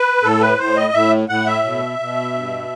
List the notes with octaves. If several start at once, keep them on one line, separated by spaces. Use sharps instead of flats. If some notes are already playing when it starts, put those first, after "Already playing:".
Already playing: B4
A2 A4
B4
A2 C5
D#5
A2 E5
A2 F#5
E5
B2
B2
G2